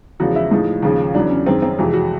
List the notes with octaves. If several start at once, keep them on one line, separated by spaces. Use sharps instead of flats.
E2 C#3 F3 G#3 F#4
E4
A2 F3 G#3 D#4
D#2 C#3 F3 G#3
E2 C#3 F#3 D4
C#4
F#2 D#3 G#3 C4
C4
F2 C3 E3 G#3 F#4
F#4